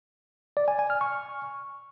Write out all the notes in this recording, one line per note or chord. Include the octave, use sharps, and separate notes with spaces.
D5
G#5
G#5
F6
C#6